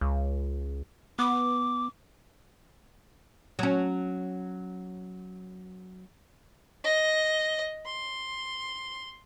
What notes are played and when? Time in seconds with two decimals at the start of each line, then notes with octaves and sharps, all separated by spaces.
0.01 C#2
1.19 B3 D6
3.59 F#3 C#4
6.84 D#5
7.85 C6